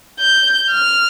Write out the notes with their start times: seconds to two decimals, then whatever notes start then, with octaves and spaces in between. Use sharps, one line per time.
0.20 G6
0.71 F6